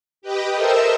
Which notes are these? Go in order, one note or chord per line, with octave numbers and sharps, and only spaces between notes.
G4 B4 D#5 G5
A4 A#4 C5 D#5 E5 E6